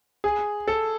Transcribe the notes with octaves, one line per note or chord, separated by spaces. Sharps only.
G#4
A4